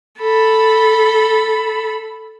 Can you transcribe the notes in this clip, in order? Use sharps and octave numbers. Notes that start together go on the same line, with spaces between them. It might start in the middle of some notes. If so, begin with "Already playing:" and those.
A4 B5